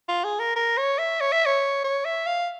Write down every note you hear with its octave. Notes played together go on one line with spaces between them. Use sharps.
F4
G#4
A#4
A#4
C#5
E5
C#5
E5
C#5
C#5
E5
F5